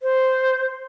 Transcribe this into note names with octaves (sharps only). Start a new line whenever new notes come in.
C5